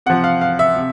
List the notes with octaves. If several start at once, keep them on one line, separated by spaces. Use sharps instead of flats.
C3 F3 F#5
F5
F5
E5
C3